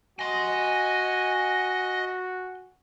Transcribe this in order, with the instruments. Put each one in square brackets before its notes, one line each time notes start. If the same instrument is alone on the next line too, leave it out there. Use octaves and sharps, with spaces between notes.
[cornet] F#4 [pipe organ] D#5 [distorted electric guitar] G#5 C6